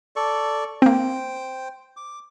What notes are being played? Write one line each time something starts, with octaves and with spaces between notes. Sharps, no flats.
A4 D5 C#6
A#3 C4 C5 G5
D6